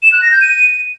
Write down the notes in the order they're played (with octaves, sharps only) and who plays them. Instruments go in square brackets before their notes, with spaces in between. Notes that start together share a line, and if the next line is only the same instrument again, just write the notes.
[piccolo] E7
F#6
A#6
G6
D#7